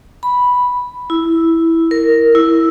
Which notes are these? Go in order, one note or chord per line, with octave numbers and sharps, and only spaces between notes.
B5
E4
A#4
E4